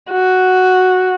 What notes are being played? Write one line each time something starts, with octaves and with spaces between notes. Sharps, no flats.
F#4